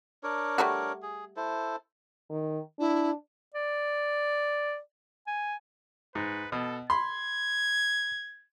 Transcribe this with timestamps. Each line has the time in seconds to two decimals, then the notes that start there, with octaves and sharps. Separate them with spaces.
0.23 D4 A#4 C#5
0.58 G3 A3 F#4
1.02 G#4
1.36 E4 A4 C5
2.30 D#3
2.79 D4 E4
3.54 D5
5.27 G#5
6.15 G#2 B4
6.52 B2 A4
6.90 B5 C6 G#6